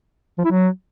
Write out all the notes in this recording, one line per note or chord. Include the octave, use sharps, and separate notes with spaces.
F3
E4
F#3